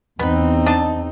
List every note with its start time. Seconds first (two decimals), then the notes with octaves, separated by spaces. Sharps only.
0.19 E2 B3 C4 D#4 B4
0.66 D4 D#5 A5